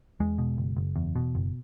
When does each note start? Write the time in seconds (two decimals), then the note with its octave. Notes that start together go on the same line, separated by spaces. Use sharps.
0.20 E2 G#3
0.38 B2
0.58 F#1
0.77 F#1
0.96 E2
1.16 B2
1.35 F#1